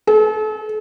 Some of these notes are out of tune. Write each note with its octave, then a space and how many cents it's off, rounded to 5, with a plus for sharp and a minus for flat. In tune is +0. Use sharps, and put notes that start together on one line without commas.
A4 -40